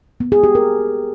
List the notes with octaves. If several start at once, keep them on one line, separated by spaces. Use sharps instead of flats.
B3
G#4
G4
A#4